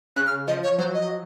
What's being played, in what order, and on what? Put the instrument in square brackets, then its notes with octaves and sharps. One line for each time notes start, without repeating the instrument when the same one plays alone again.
[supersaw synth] C#3 [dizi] F#6
[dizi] F6
[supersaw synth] F3 [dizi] D#5
[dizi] C#5
[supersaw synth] F#3 [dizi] C5
[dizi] D#5